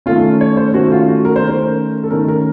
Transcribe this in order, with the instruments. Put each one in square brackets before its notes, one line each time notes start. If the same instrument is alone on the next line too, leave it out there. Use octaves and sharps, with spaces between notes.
[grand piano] D#3 A3 C#4 F4
C#5
C5
D#3 A3 C#4 F#4
F4
F#4
A#4
C5
D#3 A3 C#4 A#4
A4
D#3 A3 C#4 A#4
A#4